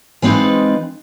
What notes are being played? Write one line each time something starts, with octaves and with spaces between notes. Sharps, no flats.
E3 G#3 C4 D#4 F4 B4